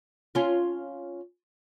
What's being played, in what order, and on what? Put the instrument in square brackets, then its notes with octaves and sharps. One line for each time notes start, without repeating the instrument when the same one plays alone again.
[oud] C#4 F4